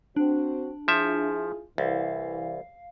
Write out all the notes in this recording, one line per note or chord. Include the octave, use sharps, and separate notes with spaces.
C4 D4 F#4
F3 E4 F4 G#4 E5
C2 E3 F5